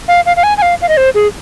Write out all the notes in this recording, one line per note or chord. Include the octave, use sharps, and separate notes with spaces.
F5
F5
F5
G#5
G#5
F5
F5
D#5
C5
G#4